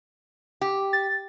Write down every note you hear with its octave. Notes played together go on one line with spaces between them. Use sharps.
G4
A6